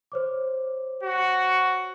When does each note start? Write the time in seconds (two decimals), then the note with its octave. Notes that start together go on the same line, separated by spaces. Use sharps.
0.12 C5 C#5 D6
1.03 F#4